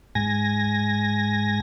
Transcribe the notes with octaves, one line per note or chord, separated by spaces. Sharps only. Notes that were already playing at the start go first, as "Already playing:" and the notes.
G#2 G#5 A#6